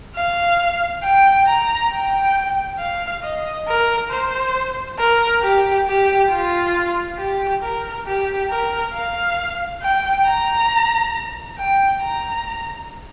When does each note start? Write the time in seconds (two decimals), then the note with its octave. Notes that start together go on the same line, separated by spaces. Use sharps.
0.16 F5
1.03 G5
1.46 A#5
1.91 G5
2.79 F5
3.23 D#5
3.67 A#4
4.10 C5
4.99 A#4
5.42 G4
5.87 G4
6.31 F4
7.18 G4
7.62 A#4
8.06 G4
8.50 A#4
8.94 F5
9.82 G5
10.26 A#5
11.58 G5
12.01 A#5